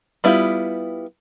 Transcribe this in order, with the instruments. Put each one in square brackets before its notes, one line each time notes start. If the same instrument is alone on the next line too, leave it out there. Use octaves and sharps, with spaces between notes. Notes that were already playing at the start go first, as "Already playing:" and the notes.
[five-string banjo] G3 B3 E4 F4 G4